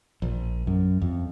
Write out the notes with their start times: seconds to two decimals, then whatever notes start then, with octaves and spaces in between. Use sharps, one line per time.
0.22 A#1
0.67 F#2
1.02 F2